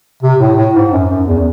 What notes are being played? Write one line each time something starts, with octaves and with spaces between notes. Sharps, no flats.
C3
A2
A2
G#2
F#2
F#2
E2